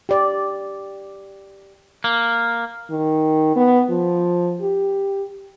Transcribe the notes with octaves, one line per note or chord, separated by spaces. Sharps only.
G4 D5
A#3
D#3
B3
F3
G4